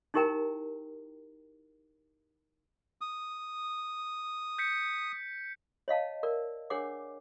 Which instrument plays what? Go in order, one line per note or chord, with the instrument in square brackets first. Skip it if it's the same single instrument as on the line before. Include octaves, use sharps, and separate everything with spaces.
[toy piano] D#4 E4 G4 A#4 G5 A#5
[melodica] D#6
[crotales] G6 B6 C#7
[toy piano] C#5 D#5 F5 A5
A#4 D5
D4 G#4 A#4 C#5 F#5 D6